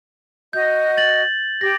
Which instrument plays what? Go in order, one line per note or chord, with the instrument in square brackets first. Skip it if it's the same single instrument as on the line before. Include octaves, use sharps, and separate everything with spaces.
[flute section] F#4 D#5 [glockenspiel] G6
[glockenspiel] A6 F#7
[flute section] G4 [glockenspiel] A#6